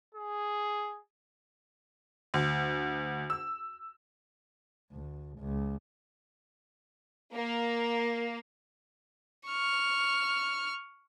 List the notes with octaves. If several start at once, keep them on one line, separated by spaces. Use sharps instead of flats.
G#4
D2
E6
D2
C#2
A#3
C#6 F6